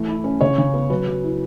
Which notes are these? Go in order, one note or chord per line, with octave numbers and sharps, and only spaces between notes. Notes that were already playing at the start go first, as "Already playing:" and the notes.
Already playing: E3 A3
E4
C#4
C#3 C#5
C#3
B3
F#3 B4
F#3
E4